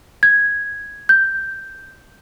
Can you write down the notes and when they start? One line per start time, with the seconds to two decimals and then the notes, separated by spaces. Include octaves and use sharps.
0.23 G#6
1.09 G6